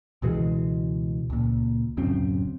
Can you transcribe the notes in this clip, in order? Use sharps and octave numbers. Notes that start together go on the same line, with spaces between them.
C#2 B2 E3 G#3
C#2 A#2
D1 F#2 C#3 C4